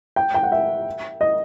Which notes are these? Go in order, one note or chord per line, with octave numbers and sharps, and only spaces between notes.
G5
G5
F#5
E5
D#5